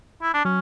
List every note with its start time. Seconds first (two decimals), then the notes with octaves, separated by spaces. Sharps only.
0.23 E4
0.34 D4
0.45 F#3 C#4